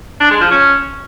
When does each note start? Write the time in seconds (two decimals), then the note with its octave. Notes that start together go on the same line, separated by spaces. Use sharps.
0.20 D4
0.31 G#3
0.41 F3
0.51 C#4